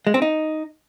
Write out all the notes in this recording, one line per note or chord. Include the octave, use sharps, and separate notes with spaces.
G#3
C4
D#4